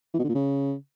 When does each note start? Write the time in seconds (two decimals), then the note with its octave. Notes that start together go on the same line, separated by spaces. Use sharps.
0.14 E3
0.19 B2
0.24 D3
0.29 A#2
0.34 C#3